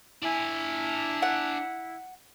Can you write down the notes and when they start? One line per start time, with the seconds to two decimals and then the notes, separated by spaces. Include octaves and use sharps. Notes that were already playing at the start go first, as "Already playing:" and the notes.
0.22 D4 E4 G#5
1.22 F#5